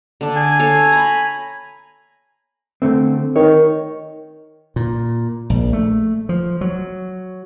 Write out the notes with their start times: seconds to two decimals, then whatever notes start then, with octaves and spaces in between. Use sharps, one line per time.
0.21 D3 D4
0.36 G#5
0.59 A4 C#5 F5
0.92 A#5 B5
2.82 D3 A3 C4
3.36 D#3 C#5
4.76 A#2
5.50 A#1
5.73 A3
6.29 F3
6.61 F#3